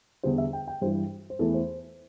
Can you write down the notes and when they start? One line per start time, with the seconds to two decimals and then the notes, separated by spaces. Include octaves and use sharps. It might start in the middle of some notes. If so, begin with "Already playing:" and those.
0.23 E2 D3 G3 C5
0.38 E5
0.53 G5
0.68 G5
0.81 G2 E3 G3 C5
1.30 C5
1.39 E2 E3 A3 A4
1.54 C5